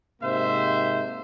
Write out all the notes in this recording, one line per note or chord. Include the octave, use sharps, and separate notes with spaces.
G#2 C3 A#3 D#4 C5 E5